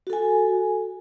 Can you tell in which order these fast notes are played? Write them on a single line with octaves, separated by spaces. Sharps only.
F#4 A4 G#5